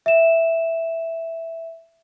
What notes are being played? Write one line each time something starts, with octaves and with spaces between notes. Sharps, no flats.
E5 E7